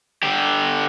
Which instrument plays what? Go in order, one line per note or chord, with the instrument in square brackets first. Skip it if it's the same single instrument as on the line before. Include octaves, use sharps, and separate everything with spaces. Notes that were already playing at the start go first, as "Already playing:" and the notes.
[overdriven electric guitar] D3 G4